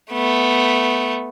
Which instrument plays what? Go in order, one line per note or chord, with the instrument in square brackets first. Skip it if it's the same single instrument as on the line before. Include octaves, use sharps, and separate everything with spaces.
[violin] A3 B3